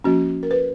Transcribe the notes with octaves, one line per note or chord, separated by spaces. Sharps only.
F3 A#3 C#4 F#4
A#4
B4